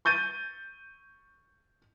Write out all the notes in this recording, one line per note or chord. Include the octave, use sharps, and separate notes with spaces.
C#6 G6 A6 D#7